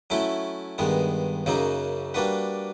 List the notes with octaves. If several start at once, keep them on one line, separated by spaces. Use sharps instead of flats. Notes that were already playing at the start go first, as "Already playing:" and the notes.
F#3 A3 C#4 E4
G2 D#3 G#3 B3
F#2 C#3 F#3 A#3 D#4
G3 A#3 D4 F#4 B4